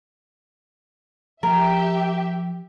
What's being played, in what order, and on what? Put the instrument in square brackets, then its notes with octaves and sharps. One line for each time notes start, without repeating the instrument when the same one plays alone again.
[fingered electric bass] F3 [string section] G4 E5 [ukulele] A#4